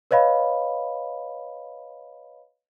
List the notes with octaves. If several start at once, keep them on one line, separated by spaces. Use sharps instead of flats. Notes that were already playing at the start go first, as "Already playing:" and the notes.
B4 C#5 D#5 F5 B5